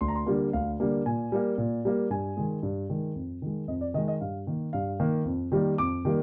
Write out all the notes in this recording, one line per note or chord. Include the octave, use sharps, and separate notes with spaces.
D2 C6
A#5
C6
D3 G3 A#3
D2 F5
D3 G3 A#3
A#2 G#5
G3 A#3
A#2
G3 A#3
G2 G#5
D#3 G#3
G2
D#3 G#3
F2
D#3 G#3
F2 D#5
D5
D#3 G#3 D#5
D#5
G2 F5
D#3 A#3
G2 F5
D#3 A#3
F2
D#3 G3 A#3
F2 D6
D#3 G3 A#3